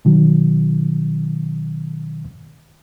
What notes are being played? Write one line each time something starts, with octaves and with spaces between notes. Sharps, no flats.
B2 D#3 F#3